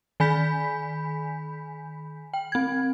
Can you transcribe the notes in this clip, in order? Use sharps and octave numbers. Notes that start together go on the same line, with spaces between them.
D#3 G#5 B5 G6 B6
G5
C4 G#6